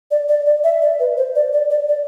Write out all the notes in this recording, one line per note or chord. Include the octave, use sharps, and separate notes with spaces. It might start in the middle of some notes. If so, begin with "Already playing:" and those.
D5
D5
D5
E5
D5
B4
C5
D5
D5
D5
D5